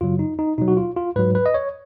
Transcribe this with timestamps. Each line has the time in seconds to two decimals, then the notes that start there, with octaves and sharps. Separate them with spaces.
0.01 F#2 C#3 F#3 F4
0.19 D#4
0.39 D#4
0.58 B2 F#3 D#4
0.68 F#4
0.77 F4
0.96 F4
1.16 G#2 F#3 B4
1.35 B4
1.46 D#5
1.54 C#5